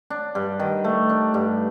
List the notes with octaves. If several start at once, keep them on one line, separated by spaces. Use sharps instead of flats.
D4
G2
D#3
A3
D4
G2